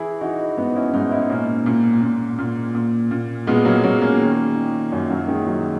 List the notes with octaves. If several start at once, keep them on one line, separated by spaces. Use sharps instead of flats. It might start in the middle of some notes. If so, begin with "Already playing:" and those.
Already playing: E3 E4 G#4
E3 D#4 F#4
G#2 B3 D#4
C#4 E4
G#2 B3 D#4
C#4 E4
D#4
A#2 A#3 C#4
A#2
A#2
A#2
A#2
A#2
A#2 G#3 B3
F#3 A#3
A#2 F#3 A#3
A#3 C#4
D#3
D#3
F#2
F#3 A#3
D#3 G#3
F#3